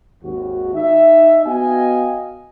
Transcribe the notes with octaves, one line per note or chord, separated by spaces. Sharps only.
G#1 D#2 F#4
D#4 E5
B3 F#4 D#5 F5 G5 G#5